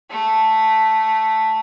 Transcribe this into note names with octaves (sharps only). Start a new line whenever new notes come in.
A3